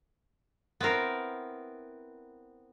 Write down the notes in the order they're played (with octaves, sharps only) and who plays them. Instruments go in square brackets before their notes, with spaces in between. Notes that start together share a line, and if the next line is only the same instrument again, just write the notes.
[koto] B3 C4 E4 A#4 C5